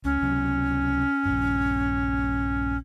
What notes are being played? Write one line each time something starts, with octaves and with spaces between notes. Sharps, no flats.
C#2 C#4
C#2 C3 F#3
A#1 G2